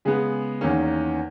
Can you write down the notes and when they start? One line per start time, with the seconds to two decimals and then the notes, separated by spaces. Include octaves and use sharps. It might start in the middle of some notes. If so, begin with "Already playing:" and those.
0.05 C#3 G#3 B3
0.61 E2 D#3 A#3 C#4